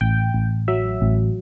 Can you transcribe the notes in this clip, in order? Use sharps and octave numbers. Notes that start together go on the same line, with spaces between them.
A1 G5
A1
F#3 E5
A1